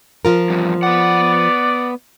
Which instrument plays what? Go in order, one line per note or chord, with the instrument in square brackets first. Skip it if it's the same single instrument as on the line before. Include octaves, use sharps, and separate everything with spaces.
[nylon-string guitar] F3 F4 A#4
[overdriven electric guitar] E2 G2
[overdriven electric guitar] B3 F#5 [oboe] D5